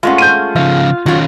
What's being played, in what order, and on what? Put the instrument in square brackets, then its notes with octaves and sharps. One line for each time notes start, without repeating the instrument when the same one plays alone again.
[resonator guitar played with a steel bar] G#3 A3 C#4 [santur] F4 F#5
[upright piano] G6 D#7
[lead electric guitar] C#3 F3 [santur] F5
[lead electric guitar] D#3 C#4 [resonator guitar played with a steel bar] F#3 F4